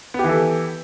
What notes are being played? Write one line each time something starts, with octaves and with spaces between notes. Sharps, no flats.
E3 B3 G4 A4